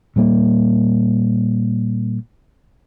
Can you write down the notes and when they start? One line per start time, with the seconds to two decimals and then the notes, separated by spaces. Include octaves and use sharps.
0.16 A#2 G3 A#3